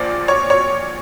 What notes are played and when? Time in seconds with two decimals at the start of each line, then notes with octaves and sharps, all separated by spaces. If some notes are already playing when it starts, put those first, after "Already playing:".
Already playing: A#1 A#2 F3 D5
0.28 C#5
0.50 C#5